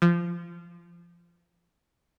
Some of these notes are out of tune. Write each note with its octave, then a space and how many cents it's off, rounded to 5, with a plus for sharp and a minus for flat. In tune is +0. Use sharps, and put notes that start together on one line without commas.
F3 -20